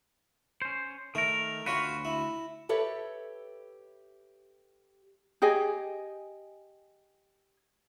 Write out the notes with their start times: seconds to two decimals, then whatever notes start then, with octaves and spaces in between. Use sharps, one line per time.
0.62 C#4 C5
1.15 D#3 A3 A#4
1.66 D2 F4 F#4 B4 C#5 F5
2.05 E4
2.69 G4 A4 B4 C#5 E5
5.42 G4 G#4 D#5 G#5